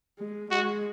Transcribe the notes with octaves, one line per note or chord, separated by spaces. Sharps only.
G#3
G#3 F#4